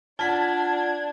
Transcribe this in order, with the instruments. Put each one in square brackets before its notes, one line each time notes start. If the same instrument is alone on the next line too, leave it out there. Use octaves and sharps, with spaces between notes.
[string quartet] D4 D5 [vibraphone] F4 F#5 [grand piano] A5 B6 [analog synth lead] G#6